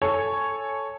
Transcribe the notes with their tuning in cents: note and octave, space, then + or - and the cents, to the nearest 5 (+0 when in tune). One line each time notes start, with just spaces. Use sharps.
A4 +0 C#5 +0 G#5 +0